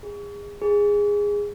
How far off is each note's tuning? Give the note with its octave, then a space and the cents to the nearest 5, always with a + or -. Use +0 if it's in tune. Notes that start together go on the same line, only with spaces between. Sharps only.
G#4 -30
G#4 -15